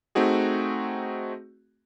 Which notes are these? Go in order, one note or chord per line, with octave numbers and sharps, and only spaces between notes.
A3 C4 D#4 F#4 G#4